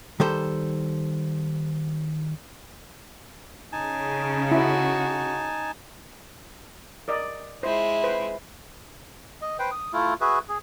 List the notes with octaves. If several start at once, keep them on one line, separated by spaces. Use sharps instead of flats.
D#3 G3 A4 C5
C#3 D#4 G#5 A5
E4 F#4
A#4 D5 D#5
G#3 E4 C5
B4 C5
D#5
B4 C5 G5
D#6
A3 E4 F4
F#4 G#4 B4 E5
G#4